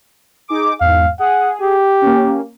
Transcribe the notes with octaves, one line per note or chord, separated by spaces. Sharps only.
D#4 G#4 D6
E2 G#2 F5
G#4 F#5
G4
A#3 C#4